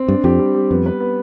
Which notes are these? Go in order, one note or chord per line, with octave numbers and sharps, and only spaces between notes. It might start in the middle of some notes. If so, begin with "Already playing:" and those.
Already playing: C4
G2 D4
F2 G4
G3
G3
F2 B3
B4
B3